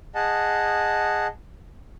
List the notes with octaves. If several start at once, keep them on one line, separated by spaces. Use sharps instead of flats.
G#4 D#5 F#5 A5